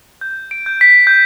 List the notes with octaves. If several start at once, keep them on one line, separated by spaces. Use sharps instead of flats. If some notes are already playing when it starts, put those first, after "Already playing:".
G6
D7
G6
B6
G6